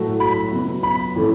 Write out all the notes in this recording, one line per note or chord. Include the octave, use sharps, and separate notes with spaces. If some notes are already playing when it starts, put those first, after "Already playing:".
Already playing: A2 F#3 A3 F#4 A4
B5
C#2 B2 F#3 B3
B5
A2 E3 A3 C#4 A4